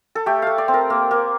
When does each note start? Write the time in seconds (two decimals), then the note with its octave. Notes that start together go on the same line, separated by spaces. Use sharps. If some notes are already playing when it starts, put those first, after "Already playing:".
0.15 A4
0.26 A3 G4
0.42 A3 F5
0.58 D5
0.68 C4
0.74 A#4
0.90 A#3
1.11 A#3